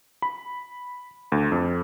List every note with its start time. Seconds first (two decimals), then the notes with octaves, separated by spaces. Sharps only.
0.22 B5
1.32 D2
1.52 F2